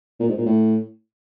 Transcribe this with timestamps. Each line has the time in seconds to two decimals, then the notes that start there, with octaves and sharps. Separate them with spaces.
0.20 A#2
0.29 G#2
0.37 A#2
0.46 A2